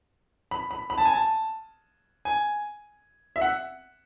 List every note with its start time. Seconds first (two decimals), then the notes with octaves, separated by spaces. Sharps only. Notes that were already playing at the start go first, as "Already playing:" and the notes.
0.51 B5
0.71 B5
0.90 B5
0.98 A5
1.05 G#5
1.13 A5
2.25 G#5
3.36 E5
3.41 F#5